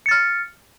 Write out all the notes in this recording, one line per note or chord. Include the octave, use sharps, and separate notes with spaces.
F6 A6 C#7